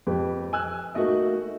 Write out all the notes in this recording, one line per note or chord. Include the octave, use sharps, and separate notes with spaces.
F2 G4 B4
G#5 E6 F#6
A3 A#3 D#4 F#4 D#5 E5